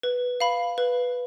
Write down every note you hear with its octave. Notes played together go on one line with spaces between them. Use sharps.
B4
F5 B5
B4